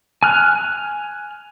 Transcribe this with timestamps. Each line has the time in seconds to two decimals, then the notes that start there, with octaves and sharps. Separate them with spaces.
0.23 G#5 F6 F#6